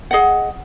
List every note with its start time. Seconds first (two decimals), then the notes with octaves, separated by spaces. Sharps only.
0.11 G#4 D#5 F#5